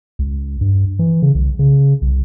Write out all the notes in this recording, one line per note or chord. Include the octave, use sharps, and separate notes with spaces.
C#2
G2
E3
C#3
C2
C#3
C2